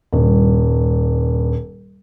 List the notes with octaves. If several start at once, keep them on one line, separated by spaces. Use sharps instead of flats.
D#1 G2